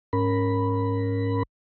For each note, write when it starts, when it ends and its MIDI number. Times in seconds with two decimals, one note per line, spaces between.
0.13 1.43 44
0.13 1.43 61
0.13 1.43 70
0.13 1.43 83